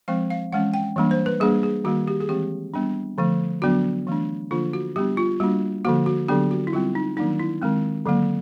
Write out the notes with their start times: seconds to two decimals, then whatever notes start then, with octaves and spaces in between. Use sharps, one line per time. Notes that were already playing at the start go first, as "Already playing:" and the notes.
0.08 F3 G#3 C4 F5
0.30 F5
0.52 E3 G#3 C#4 F#5
0.74 G5
0.96 E3 G3 A#3 D4
1.11 C5
1.26 B4
1.40 G3 A#3 D4 G#4
1.63 G#4
1.84 D#3 G3 A#3 F#4
2.08 G4
2.21 G#4
2.29 E3 G#3 C4 G4
2.74 G3 B3 D4
3.18 D3 F3 A3
3.62 D3 F#3 B3 D4 F#4
4.07 E3 A3 D4
4.51 D3 F3 A#3 D4 F4
4.73 F#4
4.96 G3 B3 D4 G4
5.17 F4
5.40 G3 A#3 D4 F#4
5.85 D3 F3 A#3 F#4
6.06 F#4
6.28 D3 F#3 B3 D4 G4
6.51 F#4
6.67 E4
6.73 D3 G3 C4 F4
6.95 D#4
7.17 D#3 F#3 A#3 D4 D#4
7.39 E4
7.62 D#3 G#3 C4
8.06 D3 F#3 A#3